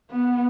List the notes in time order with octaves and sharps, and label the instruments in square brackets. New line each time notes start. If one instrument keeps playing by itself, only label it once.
[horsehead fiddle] B3